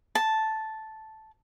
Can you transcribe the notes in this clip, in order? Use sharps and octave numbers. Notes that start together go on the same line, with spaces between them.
A5